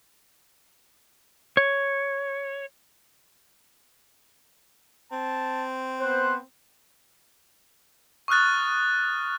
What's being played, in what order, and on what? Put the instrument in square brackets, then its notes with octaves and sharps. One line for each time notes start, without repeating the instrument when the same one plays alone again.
[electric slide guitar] C#5
[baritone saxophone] C4 [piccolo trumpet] A5
[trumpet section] B3 C5 [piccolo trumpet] F#6
[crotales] C#6 D#6 F6 F#6 A6